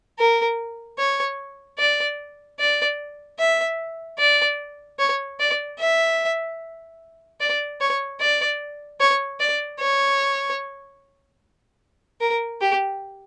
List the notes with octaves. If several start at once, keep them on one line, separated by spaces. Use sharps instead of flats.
A#4
C#5
D5
D5
E5
D5
C#5
D5
E5
D5
C#5
D5
C#5
D5
C#5
A#4
G4